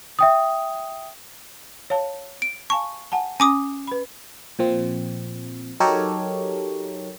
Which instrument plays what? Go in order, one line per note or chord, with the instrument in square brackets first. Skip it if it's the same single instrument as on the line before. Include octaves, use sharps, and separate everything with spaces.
[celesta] E5 G5 D#6
[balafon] C#5 F5 A5
[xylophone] D7
[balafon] F5 G#5 A5 [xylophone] C#6
[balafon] F#5 G#5 A5
[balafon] C#4 [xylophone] G#5 D6 D#6
[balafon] B4 B5
[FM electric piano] A#2 F3 C4
F#3 D#4 G4 A4 A#4 C#5